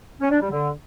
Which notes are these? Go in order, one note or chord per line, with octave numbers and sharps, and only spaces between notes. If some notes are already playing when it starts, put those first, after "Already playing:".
C#4
D4
G3
D3